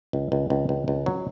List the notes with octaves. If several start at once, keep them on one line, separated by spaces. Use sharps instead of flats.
C#2
C#2
C#2
C#2
C#2
F#3